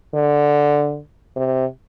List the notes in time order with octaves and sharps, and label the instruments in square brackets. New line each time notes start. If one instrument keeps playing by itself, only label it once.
[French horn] D3
C3